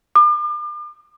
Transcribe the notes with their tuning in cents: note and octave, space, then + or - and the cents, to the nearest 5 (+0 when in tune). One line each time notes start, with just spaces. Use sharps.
D6 +40